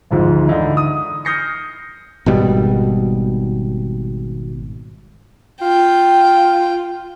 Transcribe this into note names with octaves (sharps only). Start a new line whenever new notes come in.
G#1 D2 G#2 F3
D3 E3 D#4 E4
D#6
D#6 F6 G6 A#6 C7 C#7
G#1 B2 G3
F4 G5